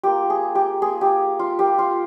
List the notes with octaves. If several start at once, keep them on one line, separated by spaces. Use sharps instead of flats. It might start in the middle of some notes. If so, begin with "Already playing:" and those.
A#3 F4 G4
G#4
G4
A#3 F4 G#4
G4
F4
A#3 F4 G4
F4